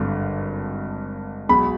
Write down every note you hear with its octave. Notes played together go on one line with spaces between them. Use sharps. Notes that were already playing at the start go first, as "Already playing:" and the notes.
Already playing: G#1 G2 D3
B1 B2 G#3 B5